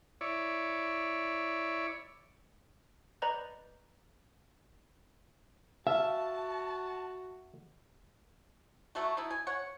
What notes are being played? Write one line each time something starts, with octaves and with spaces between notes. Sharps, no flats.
E4 C#5 D5
B4 D5 D#5 A#5 B5 G6
F#4 E5 F5 A5
F#3 A3 F#4
D#4 E4
G#5
C#5 F#5